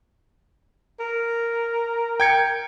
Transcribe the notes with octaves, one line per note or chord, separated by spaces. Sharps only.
A#4
G5 G#6 C#7